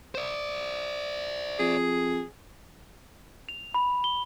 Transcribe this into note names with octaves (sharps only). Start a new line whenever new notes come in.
C5 D5
F2 G#4
F7
B5
G7